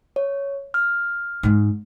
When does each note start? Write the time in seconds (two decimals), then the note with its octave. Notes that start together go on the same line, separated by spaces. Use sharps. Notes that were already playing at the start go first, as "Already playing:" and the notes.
0.16 C#5
0.74 F6
1.43 G#2 G#3